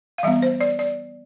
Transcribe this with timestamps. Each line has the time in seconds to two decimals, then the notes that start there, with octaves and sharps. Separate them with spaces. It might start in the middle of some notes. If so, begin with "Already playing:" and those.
0.18 F5
0.23 E3 G3 B3 E5
0.42 C5
0.61 D5
0.79 D5